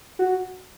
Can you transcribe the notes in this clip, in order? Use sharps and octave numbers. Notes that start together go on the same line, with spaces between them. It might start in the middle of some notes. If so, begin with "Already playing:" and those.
F#4